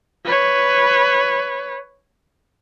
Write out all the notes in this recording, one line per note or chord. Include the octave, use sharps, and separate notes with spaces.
B4 C#5